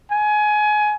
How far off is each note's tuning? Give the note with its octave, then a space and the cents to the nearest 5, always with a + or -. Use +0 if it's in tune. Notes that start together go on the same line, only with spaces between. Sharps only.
G#5 +25